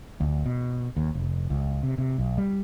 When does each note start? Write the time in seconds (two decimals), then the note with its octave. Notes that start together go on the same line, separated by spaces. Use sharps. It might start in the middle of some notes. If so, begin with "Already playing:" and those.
0.20 D2
0.46 B2
0.97 D#2
1.15 F1
1.50 C#2
1.83 C3
1.98 C3
2.18 B1
2.38 G3